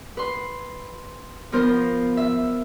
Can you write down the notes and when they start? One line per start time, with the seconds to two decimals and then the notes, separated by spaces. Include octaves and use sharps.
0.17 B4 C6
1.52 F3 B3 F4 A#4 C5
2.17 E5